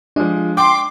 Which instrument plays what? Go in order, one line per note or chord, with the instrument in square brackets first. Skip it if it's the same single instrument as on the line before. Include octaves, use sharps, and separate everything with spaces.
[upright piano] F3 G#3 [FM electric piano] D4
[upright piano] G5 [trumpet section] C6 [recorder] D6